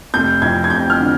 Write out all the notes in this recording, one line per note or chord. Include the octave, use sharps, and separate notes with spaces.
F1 G6
F2 G#6
G#6
F1 G6
F6
D3